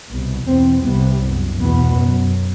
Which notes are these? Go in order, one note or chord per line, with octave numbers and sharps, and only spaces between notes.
C2 B2
E2 B2 C4
C2 C3 B3
F#2
E2 B2 B3
F#2